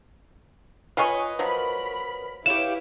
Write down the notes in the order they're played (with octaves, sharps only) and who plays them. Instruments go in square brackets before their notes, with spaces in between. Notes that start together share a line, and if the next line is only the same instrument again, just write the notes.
[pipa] F4 G#5 C#6 [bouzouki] B4 C#5 D#5
[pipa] F3 F#3 [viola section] A#4 B5
[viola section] E4 B4 [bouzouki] G4 C#5 F5 [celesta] E7